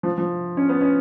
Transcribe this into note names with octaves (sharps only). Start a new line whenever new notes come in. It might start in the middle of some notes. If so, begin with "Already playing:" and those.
F3
F3
C#4
B3
C#4